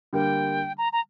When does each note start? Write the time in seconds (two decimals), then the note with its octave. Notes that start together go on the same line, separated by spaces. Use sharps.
0.13 D3 G3 A#3 G5
0.78 A#5
0.93 A#5